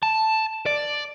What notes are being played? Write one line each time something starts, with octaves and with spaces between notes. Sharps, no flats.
A5
D5